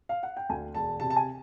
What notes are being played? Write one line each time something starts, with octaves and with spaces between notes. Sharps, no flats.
F5
F#5
G5
D2 G#5
E1 A5
C3 A5
A5
G#5